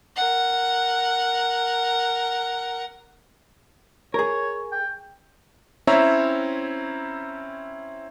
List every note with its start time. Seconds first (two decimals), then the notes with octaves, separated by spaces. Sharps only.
0.16 A#4 F#5
4.14 G#4 A#4 C#5
4.72 G5
5.87 C4 C#4 E4 C#5 E5 A#5